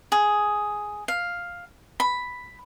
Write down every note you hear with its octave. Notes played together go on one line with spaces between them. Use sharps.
G#4
F5
B5